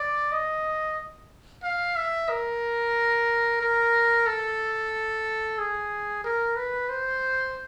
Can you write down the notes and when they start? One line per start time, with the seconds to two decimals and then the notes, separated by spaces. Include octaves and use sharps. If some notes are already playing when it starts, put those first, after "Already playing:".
Already playing: D5
0.32 D#5
1.63 F5
1.96 E5
2.29 A#4
3.61 A#4
4.27 A4
5.58 G#4
6.24 A#4
6.56 B4
6.89 C5